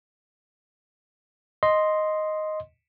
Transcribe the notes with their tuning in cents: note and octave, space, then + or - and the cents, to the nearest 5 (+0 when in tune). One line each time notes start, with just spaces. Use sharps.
D#5 +0 C6 +0